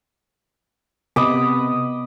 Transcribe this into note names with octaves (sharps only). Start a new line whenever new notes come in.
C3 B3 D#5 B5 D6